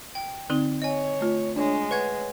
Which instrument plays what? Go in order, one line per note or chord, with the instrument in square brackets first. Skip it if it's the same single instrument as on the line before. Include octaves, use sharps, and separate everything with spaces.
[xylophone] G5
[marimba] D3 C4 D#4 [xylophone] G7
[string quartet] C#5 [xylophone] D#5 G#5
[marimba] A3 F4
[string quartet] G#3 [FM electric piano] D4 C#5
[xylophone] B4 F#5 G#6 [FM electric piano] C#5